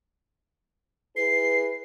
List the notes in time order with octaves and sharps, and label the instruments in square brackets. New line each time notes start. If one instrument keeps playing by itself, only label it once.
[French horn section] E4 G#4 B4 [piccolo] C7